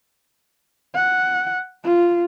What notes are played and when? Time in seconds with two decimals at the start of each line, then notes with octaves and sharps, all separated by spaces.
0.95 F#5
1.84 F4